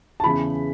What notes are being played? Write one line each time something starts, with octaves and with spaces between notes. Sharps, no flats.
A5
E2 C#3 E3 B5